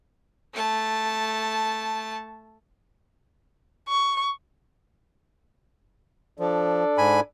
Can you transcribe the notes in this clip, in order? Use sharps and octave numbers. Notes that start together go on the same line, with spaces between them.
A3 A5
C#6
F3 D4 A4 D5
G#2 G#5 B5